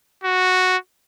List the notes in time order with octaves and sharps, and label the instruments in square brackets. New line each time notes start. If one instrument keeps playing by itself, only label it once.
[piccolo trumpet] F#4